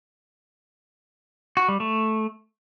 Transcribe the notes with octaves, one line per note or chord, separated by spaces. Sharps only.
F#4
G3
A3